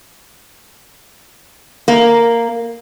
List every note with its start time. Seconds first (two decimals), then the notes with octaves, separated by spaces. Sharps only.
1.88 A#3